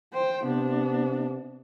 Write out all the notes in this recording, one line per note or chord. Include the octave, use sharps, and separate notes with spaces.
C5 G5
C3 B3 D4